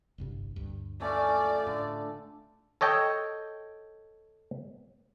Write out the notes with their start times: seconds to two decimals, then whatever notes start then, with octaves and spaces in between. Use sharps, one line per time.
0.18 G1 C2 G2
0.56 D2 G2
1.01 A3 C#4 F4 D5
1.67 A2 D3
2.81 A4 C#5 D#5 G5